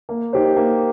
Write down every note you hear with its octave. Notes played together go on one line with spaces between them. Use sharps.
A#3
D#4 G4 C5
A#3